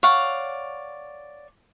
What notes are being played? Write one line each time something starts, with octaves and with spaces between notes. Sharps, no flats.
C#5 D5 F5 F#5